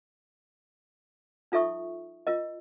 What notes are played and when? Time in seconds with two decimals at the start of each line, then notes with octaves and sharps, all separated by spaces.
1.52 D#4 F4 A4 E5 C#6 D#6
2.27 F4 A#4 D#5